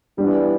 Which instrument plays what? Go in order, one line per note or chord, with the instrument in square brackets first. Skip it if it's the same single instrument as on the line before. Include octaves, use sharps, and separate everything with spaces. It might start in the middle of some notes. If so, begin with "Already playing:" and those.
[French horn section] E3 B3 D4 [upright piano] G3